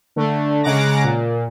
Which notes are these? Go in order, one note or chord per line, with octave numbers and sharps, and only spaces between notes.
D3 A3
C#3 G#3 F#5 A#5 D6 A#6
A#2